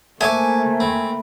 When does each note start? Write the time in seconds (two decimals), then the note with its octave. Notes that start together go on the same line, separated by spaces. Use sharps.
0.21 A3 A#3 C5 E5 G#5 A5 C#6 D6
0.80 C4 B5